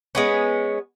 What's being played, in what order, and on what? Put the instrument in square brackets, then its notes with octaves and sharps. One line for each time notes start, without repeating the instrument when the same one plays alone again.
[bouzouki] G#3 B3 C#4